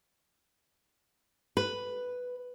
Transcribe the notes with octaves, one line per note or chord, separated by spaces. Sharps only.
B4